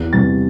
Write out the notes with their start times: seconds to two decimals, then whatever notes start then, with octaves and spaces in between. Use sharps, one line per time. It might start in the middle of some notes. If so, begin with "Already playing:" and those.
Already playing: E2
0.13 C3 G3 B3 A6